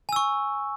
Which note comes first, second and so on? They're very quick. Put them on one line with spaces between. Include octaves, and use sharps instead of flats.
G#5 E6 C#6